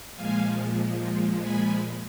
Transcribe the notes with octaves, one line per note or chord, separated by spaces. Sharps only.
A#2 F3 G#3 F5 G#5
G#5 B5